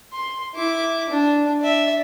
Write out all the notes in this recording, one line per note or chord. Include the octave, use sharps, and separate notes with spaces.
C6
E4 D6
D4
D5 E5